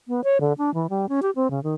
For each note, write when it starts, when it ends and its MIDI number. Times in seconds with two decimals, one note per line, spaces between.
0.08 0.21 59
0.24 0.38 73
0.41 0.53 50
0.58 0.73 62
0.74 0.87 52
0.90 1.08 55
1.09 1.20 61
1.22 1.30 67
1.36 1.50 60
1.50 1.62 49
1.63 1.75 51